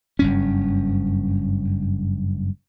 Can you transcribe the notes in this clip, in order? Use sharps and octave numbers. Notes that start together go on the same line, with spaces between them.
F#1 G2 C#4